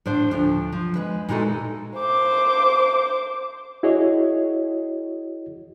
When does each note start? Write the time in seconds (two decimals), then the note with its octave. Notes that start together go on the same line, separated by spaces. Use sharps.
0.06 A2 D4 C5 F5
0.31 D2 F3 D4
0.72 F3
0.95 G#3 B4
1.29 A#2 G#3 D#4 E4 F#4 A4
1.97 C5 D6
3.83 E4 F#4 G#4 C#5 D#5